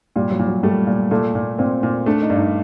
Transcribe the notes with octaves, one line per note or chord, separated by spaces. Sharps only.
A#2 G3
F#3
A#2
F#3
G3 A3
A#2
A#2 A3
A#2
A#2 C4
A#2
A3 D4
D#4
G2
D#4